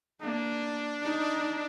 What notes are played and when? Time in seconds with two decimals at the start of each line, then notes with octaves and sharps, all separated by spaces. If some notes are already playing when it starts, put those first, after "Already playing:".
0.21 A#3 D4
1.02 D#4